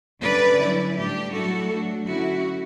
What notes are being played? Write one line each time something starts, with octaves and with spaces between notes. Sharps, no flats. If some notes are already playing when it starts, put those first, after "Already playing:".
D3 G3 C#4 B4 D5
F#3 C#4 E4
A2 G3 D4 G4
F#3 A3 E4 F#4 A4
F#3 A3 D4
D3 F#3 C#4 E4 F#4